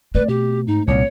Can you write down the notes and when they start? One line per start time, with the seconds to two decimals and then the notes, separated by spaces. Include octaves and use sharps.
0.15 A3 C4 B4 D5
0.29 B2 G4
0.67 G#2 D#4
0.88 C2 A#2 C#5 C#7